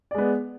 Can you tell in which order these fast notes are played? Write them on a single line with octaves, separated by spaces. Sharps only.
D5 G#3 B3